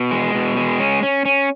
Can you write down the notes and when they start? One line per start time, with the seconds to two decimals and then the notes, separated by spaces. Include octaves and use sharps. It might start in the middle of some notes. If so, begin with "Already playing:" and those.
Already playing: B2
0.11 G#3
0.35 B2
0.57 G#3
0.79 C#4
1.03 C#4
1.25 C#4